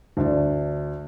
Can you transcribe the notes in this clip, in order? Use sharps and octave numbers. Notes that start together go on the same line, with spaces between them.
D2 D4